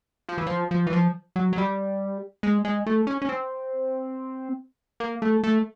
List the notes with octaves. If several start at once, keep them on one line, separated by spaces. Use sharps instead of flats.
F3
E3
F3
F3
E3
F3
F#3
F#3
G3
G#3
G#3
A3
C#4
C#4
C4
A#3
A3
A3